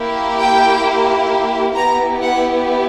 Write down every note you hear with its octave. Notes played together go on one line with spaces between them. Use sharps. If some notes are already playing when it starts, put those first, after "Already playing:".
Already playing: A#3 E4 G4
G5
B3 E4 G4 A#5
F#5